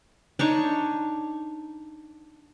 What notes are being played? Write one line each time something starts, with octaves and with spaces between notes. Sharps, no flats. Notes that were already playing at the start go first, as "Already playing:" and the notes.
D4 D#4 C#5 C#6